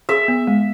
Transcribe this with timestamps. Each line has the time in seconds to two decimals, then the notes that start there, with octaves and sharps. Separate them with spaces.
0.09 G#4 E5
0.28 B3
0.47 G#3